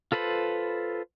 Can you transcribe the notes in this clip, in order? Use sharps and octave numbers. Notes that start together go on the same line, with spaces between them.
F4 A4 B4 C5 B5